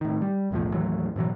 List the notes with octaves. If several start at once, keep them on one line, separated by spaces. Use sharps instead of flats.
A2 D#3
G3
B1 E2 A2 F3
D#2 A2 E3 F#3
G#2 B2 E3 F#3